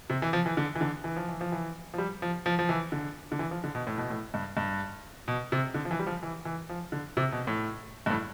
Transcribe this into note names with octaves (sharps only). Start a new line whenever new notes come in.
C3
E3
F3
E3
D3
E3
D3
E3
F3
E3
F3
E3
F3
G3
F3
F3
F3
E3
D3
D3
E3
F3
D3
B2
A2
B2
A2
G2
G2
B2
C3
D3
F3
E3
G3
F3
E3
E3
F3
D3
C3
B2
A2
G2
A2